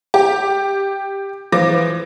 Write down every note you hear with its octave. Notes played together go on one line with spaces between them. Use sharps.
G4
E3 F3 D6 A#6